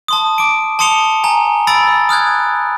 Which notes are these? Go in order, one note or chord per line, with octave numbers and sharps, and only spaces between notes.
A5 C6 D#6
D6 D7
A5 C6 D#6 C#7 F7 G7
G#5 A#5
B5 E6 A6 D7
D#6 F6 F#6 G#6